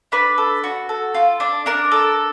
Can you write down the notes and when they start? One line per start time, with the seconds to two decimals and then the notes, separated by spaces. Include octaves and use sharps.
0.12 D4 B4
0.38 A4
0.64 F#4
0.89 A4
1.14 F4
1.40 D4
1.66 D4 A#4
1.92 A4